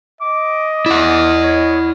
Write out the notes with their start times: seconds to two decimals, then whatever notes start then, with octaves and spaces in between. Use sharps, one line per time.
0.21 D#5 D6
0.86 E4 D5 F#5
1.43 C#5